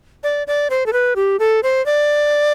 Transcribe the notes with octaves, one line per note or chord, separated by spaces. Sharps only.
D5
D5
C5
A4
B4
G4
A4
C5
D5